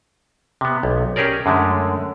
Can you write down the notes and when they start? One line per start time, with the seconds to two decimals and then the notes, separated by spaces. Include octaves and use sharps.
0.61 C3 B3
0.83 B1
1.16 C#4 G4 G#4 A#4 D5
1.46 F#2 D3 G#3 A3